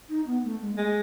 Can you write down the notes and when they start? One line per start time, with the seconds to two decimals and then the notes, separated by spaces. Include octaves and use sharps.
0.09 D#4
0.27 B3
0.44 A3
0.61 G#3
0.73 A#3
0.77 G#3 A3